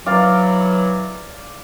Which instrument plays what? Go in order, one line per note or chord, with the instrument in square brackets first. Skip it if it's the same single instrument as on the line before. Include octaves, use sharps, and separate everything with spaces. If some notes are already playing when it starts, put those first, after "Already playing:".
[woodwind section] E3 F#3 [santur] D5 F5 D6